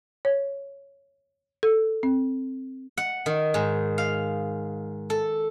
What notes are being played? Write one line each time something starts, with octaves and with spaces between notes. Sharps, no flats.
C#5
A4
C4
F#5
D#3
G#2
F5
A4